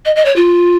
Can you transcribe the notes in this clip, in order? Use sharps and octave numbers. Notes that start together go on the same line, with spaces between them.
D#5
D#5
C#5
F4